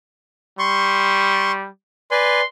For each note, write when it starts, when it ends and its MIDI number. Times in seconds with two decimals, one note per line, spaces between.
0.59 1.68 55
0.59 1.52 84
0.59 1.52 85
2.11 2.41 71
2.11 2.41 74
2.11 2.41 80
2.11 2.48 84